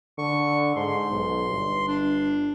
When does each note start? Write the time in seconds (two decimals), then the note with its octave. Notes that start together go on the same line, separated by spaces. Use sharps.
0.18 D3 C#6
0.76 G#2 C6
1.11 B1
1.50 G1
1.88 D4